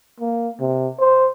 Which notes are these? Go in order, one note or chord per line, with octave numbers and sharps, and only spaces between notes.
A#3
C3
C5